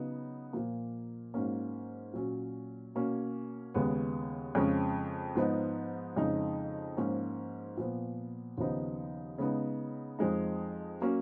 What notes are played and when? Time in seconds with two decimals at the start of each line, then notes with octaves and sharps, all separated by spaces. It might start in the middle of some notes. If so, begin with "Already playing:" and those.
Already playing: C#3 F#3 B3 D#4
0.53 A#2 F3 A#3
1.34 G#2 F#3 A#3 C#4
2.13 A#2 F#3 C#4
2.95 B2 A#3 C#4
3.74 D#2 C#3 G#3 B3
4.55 F2 C#3 G#3 C#4
5.36 G#2 F3 B3 D#4
6.17 F2 C#3 G#3 D#4
6.97 G#2 F3 A#3 C#4
7.77 A#2 F3 B3
8.58 D#2 C#3 F3 B3 D#4
9.38 C#3 G#3 B3 D#4
10.19 F2 F3 G#3 D#4
11.01 F#3 A#3 C#4